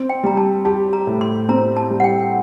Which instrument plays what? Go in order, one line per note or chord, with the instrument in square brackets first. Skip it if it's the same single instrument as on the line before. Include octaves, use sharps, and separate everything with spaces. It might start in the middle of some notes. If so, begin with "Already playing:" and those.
Already playing: [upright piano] C4
[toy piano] G5
[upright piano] G3 [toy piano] A#5
[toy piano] A5
[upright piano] G4 [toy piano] A5
[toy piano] A#5
[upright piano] A2
[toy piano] C6
[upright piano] C4 [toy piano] A#5
[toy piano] A5
[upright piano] G3
[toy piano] F#5
G5